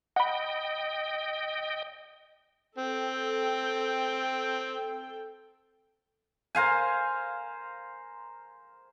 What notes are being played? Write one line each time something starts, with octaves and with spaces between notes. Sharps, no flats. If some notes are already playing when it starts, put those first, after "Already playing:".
D#5 F#5 G5 B5
C4 A4 G5
A#4 C5 F5 G#5